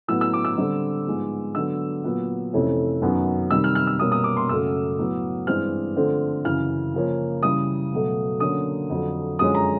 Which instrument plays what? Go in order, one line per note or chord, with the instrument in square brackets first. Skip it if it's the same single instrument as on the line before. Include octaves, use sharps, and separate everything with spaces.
[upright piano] A2 F#3 B3 E6
E6
D6
E6
D3 G3 C4
G#2 F3 G#3 B3
D3 F#3 B3 E6
A#2 F#3 B3
F2 C3 E3 A3 C#4
F#2 D#3 F#3 B3
C3 D#3 G3 E6
F6
F6
E6
B2 G3 A#3 C#4 D#6
D#6
D6
C6
F#2 C#3 F#3 A3 E6
A2 F#3 B3
G2 E3 G#3 C4 F6
D3 F3 A3 C4
F#2 C#3 E3 F6
C#3 F3 A#3 C#4
C#3 E3 G3 D#6
B2 F#3 A3
D3 F#3 A#3 C#4 D#6
F2 D3 F#3
F#2 D3 F3 G#3 C#4 D#6
A#5